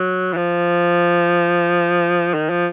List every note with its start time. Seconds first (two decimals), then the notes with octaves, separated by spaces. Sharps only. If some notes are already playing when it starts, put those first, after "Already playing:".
Already playing: F#3
0.33 E3
0.37 F3
2.34 D#3
2.50 F3